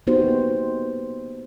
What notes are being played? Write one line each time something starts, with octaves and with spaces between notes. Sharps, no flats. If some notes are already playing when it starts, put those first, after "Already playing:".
A#3 B3 D#4 F#4 G4 C5